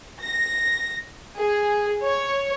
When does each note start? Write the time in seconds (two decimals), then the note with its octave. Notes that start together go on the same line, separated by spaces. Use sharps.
0.20 A#6
1.39 G#4
2.03 C#5